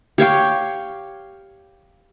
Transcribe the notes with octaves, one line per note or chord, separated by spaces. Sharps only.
G4 C#5 F5 G5